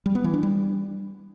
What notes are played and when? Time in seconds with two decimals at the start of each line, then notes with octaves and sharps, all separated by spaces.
0.06 G3
0.15 B3
0.24 E3
0.34 D4
0.43 G3